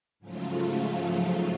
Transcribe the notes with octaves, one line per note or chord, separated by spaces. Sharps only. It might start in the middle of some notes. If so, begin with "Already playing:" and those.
G#2 C#3 F3 F#3 A3 F4